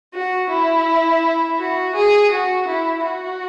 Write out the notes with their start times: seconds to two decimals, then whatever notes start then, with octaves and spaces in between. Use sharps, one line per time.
0.14 F#4
0.50 E4
1.59 F#4
1.96 G#4
2.32 F#4
2.68 E4
3.04 F#4